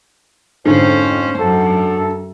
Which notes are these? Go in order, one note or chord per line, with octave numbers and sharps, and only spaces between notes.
F2 G#2 D3 C#4 C5
F#2 A4